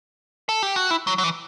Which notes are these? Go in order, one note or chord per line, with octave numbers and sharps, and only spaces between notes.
A4
G4
F#4
E4
F#3
F#3
E3